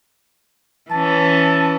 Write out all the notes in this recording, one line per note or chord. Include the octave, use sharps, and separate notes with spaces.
E3 C#4 A5